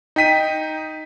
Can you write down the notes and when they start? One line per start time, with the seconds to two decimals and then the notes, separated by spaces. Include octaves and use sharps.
0.16 D#4 G5 B6 D#7